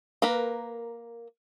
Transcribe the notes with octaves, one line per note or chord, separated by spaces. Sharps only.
A#3 A#4 B4